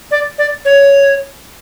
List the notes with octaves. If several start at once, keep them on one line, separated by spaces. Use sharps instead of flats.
D5
D5
C#5